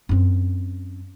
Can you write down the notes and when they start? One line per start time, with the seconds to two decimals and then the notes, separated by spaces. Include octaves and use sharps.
0.09 F#2 C4